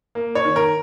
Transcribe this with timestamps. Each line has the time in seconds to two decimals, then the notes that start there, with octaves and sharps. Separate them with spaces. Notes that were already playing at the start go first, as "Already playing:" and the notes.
0.15 A#3
0.35 C#5
0.45 D#3
0.56 A#4